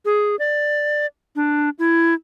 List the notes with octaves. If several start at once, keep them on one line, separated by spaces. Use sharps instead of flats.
G#4
D5
D4
E4